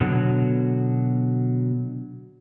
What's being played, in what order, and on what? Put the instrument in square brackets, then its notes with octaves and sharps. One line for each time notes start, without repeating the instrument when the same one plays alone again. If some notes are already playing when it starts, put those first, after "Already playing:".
[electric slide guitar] B2 D3 F#3